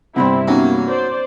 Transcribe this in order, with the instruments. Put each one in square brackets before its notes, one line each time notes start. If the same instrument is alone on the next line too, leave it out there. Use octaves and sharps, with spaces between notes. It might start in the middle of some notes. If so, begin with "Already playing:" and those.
[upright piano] G2 C3 [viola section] C4 E4 [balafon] F#5 B5 C6
[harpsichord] F#3 [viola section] A#3 [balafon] B3 C#4 D#4
[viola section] C5 D5